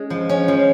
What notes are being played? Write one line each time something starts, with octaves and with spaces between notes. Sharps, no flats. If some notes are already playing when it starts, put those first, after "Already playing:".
Already playing: G#3 C#4
F3
C#4
F3